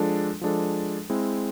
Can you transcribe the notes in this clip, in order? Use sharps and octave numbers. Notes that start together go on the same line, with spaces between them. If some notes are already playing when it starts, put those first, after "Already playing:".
Already playing: F3 G#3 D4 A4
F3 G#3 D4 A4
G#3 C4 E4